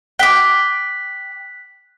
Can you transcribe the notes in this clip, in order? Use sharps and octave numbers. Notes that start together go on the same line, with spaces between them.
G5 D6 F#6 B6